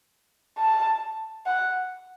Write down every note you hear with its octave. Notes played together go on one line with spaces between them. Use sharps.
A5
F#5